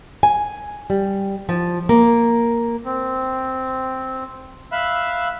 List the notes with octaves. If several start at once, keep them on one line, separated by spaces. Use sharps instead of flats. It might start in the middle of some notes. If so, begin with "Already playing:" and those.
G#5
G3
F3
A#3
C4
E5 F5 B5 E6 F#6